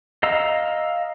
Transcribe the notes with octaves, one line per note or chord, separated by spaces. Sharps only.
D#5 F5 A#5 E6